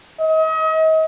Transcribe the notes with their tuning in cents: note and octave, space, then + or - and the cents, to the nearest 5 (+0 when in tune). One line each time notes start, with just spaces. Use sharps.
D#5 +40